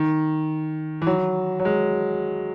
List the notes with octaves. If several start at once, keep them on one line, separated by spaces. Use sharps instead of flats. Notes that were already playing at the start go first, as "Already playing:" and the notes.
Already playing: D#3
E3
F#3
F#3
G#3